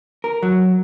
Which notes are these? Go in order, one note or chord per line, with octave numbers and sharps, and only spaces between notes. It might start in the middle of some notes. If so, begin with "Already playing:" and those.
A#4
F#3